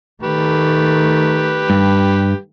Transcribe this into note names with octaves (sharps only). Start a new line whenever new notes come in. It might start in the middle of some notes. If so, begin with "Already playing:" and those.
D#3 A3 G4 B4
G2